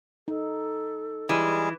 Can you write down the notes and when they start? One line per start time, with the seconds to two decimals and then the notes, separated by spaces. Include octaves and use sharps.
0.28 D#4 A4
1.29 E3 G3 G#3 G#4